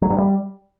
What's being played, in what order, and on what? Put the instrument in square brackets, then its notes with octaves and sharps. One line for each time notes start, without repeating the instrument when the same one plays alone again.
[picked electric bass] F#3
G2
G3